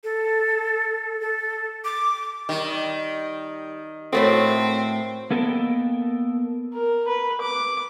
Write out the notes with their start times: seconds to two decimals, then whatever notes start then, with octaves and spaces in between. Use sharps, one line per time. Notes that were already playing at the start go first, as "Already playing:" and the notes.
0.04 A4
1.20 A4
1.85 D6
2.49 D#3 G3
4.13 A2 A3 C4 F#4 A4 A#4 C#5
5.31 A#3 B3 A4 A#4 D#5 G5
6.74 A#4
7.07 B4
7.41 D6